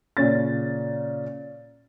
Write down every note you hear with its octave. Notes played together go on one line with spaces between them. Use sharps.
A#2 C#3 C#4 A6